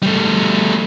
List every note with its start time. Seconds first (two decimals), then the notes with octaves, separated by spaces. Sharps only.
0.03 G3 A3